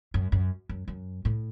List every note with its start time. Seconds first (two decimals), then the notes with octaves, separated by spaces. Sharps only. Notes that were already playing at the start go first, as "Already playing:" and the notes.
0.14 F#2
0.32 F#2
0.69 F#2
0.88 F#2
1.25 A2